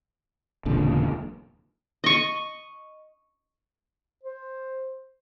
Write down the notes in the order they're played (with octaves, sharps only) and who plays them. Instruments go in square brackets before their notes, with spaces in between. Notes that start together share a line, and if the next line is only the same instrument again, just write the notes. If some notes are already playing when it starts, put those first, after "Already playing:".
[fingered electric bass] E1 C#2 A#2 D3
[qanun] D#5 C#6
[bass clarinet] C5